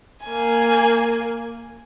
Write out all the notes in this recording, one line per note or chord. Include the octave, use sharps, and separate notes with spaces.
A#3 G#5